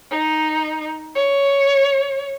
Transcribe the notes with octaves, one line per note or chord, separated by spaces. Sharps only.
D#4
C#5